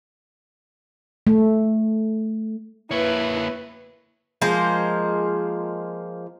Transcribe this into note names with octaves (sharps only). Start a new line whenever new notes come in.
A3
A#3 E4 B4 C#5
F3 G#3 A#3 C5